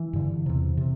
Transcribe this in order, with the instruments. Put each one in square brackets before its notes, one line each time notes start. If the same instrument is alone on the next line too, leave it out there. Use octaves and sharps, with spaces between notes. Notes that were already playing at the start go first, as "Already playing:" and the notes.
Already playing: [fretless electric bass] E3
G2 D3
E2 C3
C3